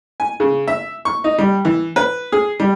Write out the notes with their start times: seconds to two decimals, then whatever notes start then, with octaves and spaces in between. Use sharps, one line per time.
0.20 G#5
0.40 C#3
0.68 E5
1.05 C#6
1.24 D#4
1.38 G3
1.65 E3
1.96 B4
2.32 G#4
2.60 G3